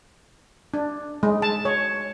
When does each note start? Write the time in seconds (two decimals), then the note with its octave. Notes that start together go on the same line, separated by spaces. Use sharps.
0.74 D4
1.23 G#3
1.42 A5
1.65 C#5